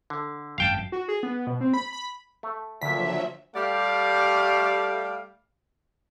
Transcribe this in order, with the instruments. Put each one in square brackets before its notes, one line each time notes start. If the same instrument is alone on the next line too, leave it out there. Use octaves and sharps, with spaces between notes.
[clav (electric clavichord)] D3
[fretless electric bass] G#1 F#2 [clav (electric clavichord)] F5 G5 A5
[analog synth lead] F#4
G#4
B3
B2
C4
B5
B5
[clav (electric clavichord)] A3
[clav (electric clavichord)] D2 A#2 [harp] D3 [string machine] F3 F#3 E5 [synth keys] B6
[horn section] G3 A3 G4 D5 F5